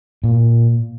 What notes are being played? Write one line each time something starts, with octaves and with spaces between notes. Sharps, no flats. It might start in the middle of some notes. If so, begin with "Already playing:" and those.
A#2